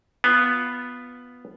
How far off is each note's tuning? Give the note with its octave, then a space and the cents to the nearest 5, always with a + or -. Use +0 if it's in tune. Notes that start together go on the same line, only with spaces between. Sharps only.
B3 +0 F4 +0